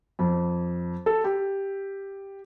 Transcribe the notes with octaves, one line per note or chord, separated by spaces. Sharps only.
F2
A4
G4